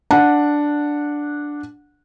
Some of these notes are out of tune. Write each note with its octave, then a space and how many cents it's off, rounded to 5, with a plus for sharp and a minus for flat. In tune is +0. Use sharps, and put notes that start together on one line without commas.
D4 +0 F#5 -15